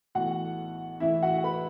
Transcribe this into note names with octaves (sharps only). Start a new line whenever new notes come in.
B1 A2 E3 F#4 F#5
A1 A2 E3 E4 E5
F#4 F#5
B4 B5